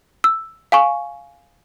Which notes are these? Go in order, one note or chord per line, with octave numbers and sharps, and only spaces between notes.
E6
F5 G#5 C#6